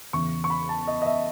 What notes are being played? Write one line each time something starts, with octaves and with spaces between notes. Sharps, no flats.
E2 C#3 E3 C#6
C#6
B5
A5
D#5
D#5
E5